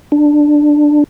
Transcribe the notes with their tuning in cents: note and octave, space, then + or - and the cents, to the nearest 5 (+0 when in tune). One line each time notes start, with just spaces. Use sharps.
D4 +10